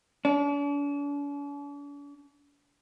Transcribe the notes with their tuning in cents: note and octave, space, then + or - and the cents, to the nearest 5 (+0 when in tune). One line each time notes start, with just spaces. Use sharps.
D4 -45